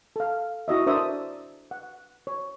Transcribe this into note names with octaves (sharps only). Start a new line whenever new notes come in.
A4 F5
E4 F#4 D#5 E5
D4 A#4 C5 D5 E5 D#6
F#5
C#5